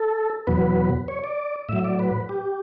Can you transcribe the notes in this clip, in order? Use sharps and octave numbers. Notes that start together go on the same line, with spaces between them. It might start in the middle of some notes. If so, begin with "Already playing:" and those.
Already playing: A4
E2 B2 F#3 B4
C#5
D5
A2 F#3 E5
D5
B4
G4